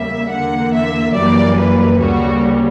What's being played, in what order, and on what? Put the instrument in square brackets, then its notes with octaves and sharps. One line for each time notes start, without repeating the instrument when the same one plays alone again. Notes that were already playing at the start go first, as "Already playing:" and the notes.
Already playing: [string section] E2 C#3 G3 A#3 E5
E2 D3 A#3 F#5
E5
F#2 E3 G3 A#3 D5
B4
D2 C#3 G3 A#3 F#4